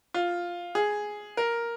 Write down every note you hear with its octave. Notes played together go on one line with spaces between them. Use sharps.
F4
G#4
A#4